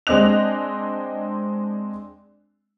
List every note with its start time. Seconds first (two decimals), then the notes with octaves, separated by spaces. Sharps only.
0.07 G#3 C4 D4 D#5 F#6 F7